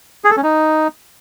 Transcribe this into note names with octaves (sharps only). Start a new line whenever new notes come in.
G#4
A4
C#4
D#4